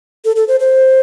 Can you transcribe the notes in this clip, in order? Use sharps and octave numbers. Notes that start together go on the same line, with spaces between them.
A4
A4
C5
C5